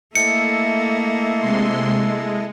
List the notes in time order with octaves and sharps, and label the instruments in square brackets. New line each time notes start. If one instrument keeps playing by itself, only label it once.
[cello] A3 A#3 [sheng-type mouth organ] E4 A4 D#5 [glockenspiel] C#7
[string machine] C3 G#3 C6
G#3